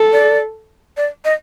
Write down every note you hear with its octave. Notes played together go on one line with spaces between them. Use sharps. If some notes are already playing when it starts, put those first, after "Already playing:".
Already playing: A4
D5
D5
D#5